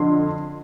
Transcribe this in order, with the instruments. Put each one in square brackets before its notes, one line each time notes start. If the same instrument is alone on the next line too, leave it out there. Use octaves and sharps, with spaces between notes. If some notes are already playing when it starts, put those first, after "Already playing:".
Already playing: [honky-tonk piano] F2 D3 C6